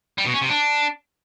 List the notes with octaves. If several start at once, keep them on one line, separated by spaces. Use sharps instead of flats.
G3
B2
C#4
C3
D4